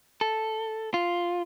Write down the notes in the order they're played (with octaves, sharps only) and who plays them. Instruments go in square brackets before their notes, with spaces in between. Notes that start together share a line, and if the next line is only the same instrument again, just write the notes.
[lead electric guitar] A4
F4